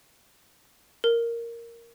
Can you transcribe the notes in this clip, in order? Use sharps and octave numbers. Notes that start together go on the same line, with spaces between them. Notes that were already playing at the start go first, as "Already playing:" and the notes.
A#4